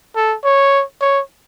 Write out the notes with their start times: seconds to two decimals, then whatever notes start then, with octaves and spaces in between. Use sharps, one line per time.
0.16 A4
0.44 C#5
1.01 C#5